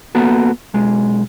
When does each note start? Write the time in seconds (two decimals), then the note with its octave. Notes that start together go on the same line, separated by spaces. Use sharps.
0.15 A#3 B3 F#4 A4
0.74 B1 G#3